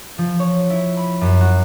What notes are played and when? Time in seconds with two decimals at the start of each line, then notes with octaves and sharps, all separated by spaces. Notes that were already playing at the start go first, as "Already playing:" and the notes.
0.18 F3
0.39 C#5
0.70 E4
0.97 B5
1.21 F#2
1.41 F#4